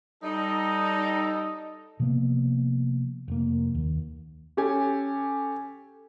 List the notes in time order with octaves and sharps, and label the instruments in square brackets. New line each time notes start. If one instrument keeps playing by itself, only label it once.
[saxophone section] G3 D#4 [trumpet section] A4 D#5
[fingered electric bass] C3 F3 A#3 B3
F1 A#3
D#2
[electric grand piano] C#4 G4 A4 G#5